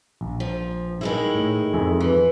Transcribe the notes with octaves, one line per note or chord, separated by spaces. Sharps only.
A#1
F3
D#3 G#3 E4
A2
F2 G#4 E5
E3